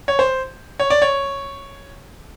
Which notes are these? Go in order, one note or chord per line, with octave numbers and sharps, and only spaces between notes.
C#5
C5
C#5
D5
C#5